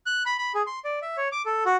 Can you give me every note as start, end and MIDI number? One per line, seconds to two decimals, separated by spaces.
0.06 0.23 90
0.26 0.37 83
0.38 0.52 83
0.54 0.62 68
0.67 0.79 84
0.85 0.99 74
1.02 1.17 76
1.17 1.28 73
1.32 1.42 86
1.46 1.64 69
1.66 1.76 66